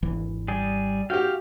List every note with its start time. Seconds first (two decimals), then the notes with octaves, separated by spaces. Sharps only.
0.03 G#1 E2 E3
0.48 G3 G#4
1.10 F#4 G4 F5 G5